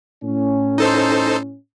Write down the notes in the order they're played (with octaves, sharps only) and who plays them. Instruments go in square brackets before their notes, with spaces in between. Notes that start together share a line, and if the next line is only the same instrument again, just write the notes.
[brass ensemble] A2 C#4
[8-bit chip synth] D#4 A4 C5